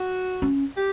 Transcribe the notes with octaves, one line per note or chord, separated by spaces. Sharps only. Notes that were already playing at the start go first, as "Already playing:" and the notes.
Already playing: F#4
C#4
G4